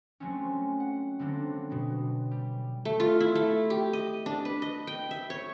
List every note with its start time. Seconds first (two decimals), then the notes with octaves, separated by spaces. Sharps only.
0.20 F#3 G#3 A3 C4 C#4
0.80 F#5
1.19 D3 F#3 G3 A#3 C4 D4
1.70 B2 F#3
2.31 G3
2.85 A3
3.00 F4
3.20 E4
3.35 A3
3.70 G4
3.93 D#5
4.26 D4
4.45 B4
4.62 D#5
4.87 G5
5.11 E5
5.30 C#5